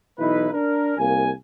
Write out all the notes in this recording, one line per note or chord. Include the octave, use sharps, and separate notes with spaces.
B1 E3 D#4 E4 B4
D4 A#4
C2 A#3 G#5